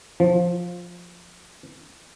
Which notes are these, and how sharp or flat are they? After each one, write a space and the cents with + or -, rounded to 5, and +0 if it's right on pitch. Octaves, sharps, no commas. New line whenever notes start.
F3 +10